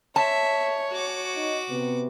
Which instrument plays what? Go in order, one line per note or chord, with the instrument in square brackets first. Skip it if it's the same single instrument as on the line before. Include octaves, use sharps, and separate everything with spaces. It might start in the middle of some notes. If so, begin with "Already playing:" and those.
[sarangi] C#5 [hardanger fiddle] E5 [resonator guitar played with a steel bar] A5
[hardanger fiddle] F#4 D6
[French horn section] D#4
C3 B3